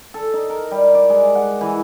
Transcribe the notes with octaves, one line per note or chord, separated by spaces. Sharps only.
A4
D#4
A#4
G3
D5
G#3
F#5
E3